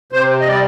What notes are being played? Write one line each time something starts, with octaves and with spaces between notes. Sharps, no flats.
C3 C5
D#5
G3 D5